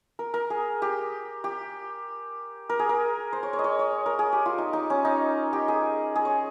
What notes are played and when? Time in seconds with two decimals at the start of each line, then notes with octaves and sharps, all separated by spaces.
0.19 A#4
0.34 A#4
0.50 G#4
0.82 G4
1.44 G4
2.69 A#4
2.79 G#4
2.89 A#4
3.33 C5
3.43 C#5
3.53 C#5
3.59 D#5
3.64 C#5
3.79 C#5
4.06 A#4
4.19 G#4
4.32 G4
4.46 F4
4.58 D#4
4.73 D#4
4.90 C#4
5.05 D#4
5.53 G4
5.68 G#4
6.15 G#4
6.25 C#5